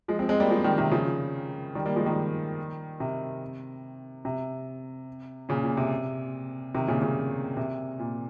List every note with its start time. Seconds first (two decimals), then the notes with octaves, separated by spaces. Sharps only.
0.08 F3 G#3
0.19 G#3 C4
0.29 G#3 C4
0.40 G3 A#3
0.50 F3 G#3
0.64 D#3 G3
0.78 C3 D#3
0.91 C#3 F3
1.75 D#3 G3
1.85 G3 A#3
1.96 F3 G#3
2.06 D#3 G3
3.00 C3
4.25 C3
5.49 A#2 C#3
5.64 A#2
5.77 C3
6.75 C3 D#3
6.87 A#2 C#3
7.02 A#2 C#3
7.57 C3
7.99 A#2